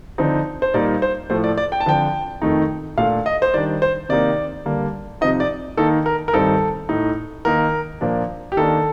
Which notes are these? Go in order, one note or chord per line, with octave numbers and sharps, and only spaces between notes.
D3 F3 C4 D#4
C5
A#2 G3 A#3 D#4 D5
C5
A2 F3 A3 C5
D5
D5
G5
A5
D3 F3 C4 G5
F2 D#3 A3 D#4
A#2 A3 D4 F5
D#5
C5
D#3 G3 D4 D5
C5
C3 D#3 A#3 D#4 D5
D3 G3 A#3
C3 F3 C4 D#4 D#5
D5
D#3 A#3 D#4 A4
A#4
A#4
G2 D#3 G3 C4 D#4 A4
A2 A3 D#4
D#3 A#3 D#4 A#4
A#2 F3 A#3 D4
G4
D#3 A#3 D4 A4